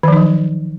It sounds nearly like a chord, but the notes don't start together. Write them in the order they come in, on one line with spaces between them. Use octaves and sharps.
D#3 F3 D#4 F#3